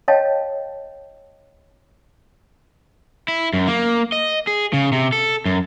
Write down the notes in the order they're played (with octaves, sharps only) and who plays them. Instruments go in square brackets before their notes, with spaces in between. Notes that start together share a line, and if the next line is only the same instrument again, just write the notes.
[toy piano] C#5 D#5 F5 G5 A5
[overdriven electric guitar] E4
F#2
A#3
D#5
G#4
C#3
C3
A4
F#2